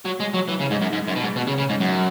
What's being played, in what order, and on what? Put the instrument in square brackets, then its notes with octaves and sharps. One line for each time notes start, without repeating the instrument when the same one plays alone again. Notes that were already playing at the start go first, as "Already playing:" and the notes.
[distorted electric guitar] F#3
G#3
F#3
E3
C#3
G#2
F#2
G#2
F#2
B2
G#2
B2
C#3
C#3
G#2
F#2